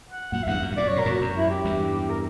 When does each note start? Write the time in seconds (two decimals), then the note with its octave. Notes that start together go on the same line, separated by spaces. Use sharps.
0.10 F#5
0.32 F#2 A#2 F#5
0.43 E5
0.47 E2 G2 F#5
0.62 F#2
0.72 G2
0.77 F#2 A#2 D5
0.88 C#5
0.96 B2 A#4
1.06 F#2 A#2 F#4
1.21 F#2
1.36 E4
1.50 G4
1.65 E2 G2
2.10 A#4